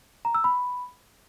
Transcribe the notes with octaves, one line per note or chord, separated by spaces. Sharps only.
A#5
E6
B5